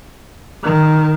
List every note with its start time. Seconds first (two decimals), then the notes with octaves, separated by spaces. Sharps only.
0.64 D#3